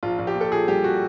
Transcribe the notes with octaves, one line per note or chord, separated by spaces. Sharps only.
A#1 F4
A#1
G4
A#2
A4
A#2 G#4
G3 G4
F#4